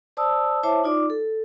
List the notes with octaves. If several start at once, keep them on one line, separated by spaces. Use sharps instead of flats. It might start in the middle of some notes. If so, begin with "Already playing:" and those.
C5 D5 A5 D#6 E6
E4 C5 C#5 E5 A5 D6
D#4 F4 D5 D6
A4